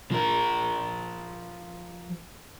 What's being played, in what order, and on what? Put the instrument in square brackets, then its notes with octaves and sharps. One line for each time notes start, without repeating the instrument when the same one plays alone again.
[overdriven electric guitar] F3 A#4